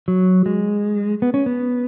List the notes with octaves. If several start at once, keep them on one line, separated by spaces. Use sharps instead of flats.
F#3
G#3
B3
C#4
B3